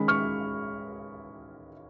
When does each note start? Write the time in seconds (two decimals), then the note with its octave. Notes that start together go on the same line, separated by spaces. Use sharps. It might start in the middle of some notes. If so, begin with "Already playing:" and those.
Already playing: D#3 G#3 C#4 B5
0.08 C#6 F6